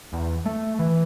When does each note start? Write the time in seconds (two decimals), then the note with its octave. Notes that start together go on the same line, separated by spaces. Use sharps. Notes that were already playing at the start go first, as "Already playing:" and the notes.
0.13 E2
0.46 A3
0.79 E3